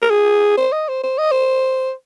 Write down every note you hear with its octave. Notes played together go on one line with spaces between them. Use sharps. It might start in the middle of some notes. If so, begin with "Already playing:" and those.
A#4
G#4
C5
D#5
C5
C5
D#5
C5